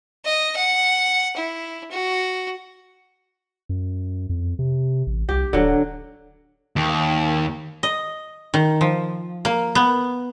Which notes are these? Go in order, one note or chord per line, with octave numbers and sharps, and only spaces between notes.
D#5
F#5
E4
F#4
F#2
F2
C3
A1
C2 G4
D1 D3 F#3
D#2
D#5
D#3
F3
A#3
B3